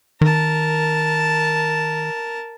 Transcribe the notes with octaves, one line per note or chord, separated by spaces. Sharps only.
D#3 A#4 A5